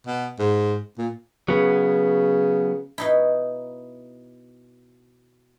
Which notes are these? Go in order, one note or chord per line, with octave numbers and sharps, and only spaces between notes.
B2
G#2
A#2
C#3 F#3 B3
B2 D#4 E4